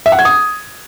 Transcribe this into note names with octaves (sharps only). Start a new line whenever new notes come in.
E5
F#5
G#6
D#6